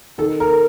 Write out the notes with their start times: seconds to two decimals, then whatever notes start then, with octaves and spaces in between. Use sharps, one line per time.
0.18 D#3 A4
0.40 A#4